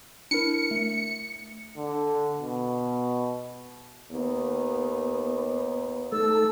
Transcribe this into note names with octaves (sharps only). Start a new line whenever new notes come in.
D4 E4 A#4 C#7
A3
D3
B2
D#2 B3
A3 D#4 A4 E6